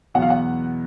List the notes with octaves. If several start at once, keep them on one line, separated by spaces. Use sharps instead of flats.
E2 B2 F#3 B3 F#5
F5
F#5